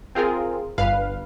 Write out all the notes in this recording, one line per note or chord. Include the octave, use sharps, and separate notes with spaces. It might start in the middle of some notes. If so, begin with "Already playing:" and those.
C4 F4 G#4 A#4
G1 G2 B4 F5